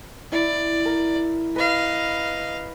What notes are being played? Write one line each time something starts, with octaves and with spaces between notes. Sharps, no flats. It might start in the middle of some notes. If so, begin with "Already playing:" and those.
E4 D5
A#4
B4 D#5 F5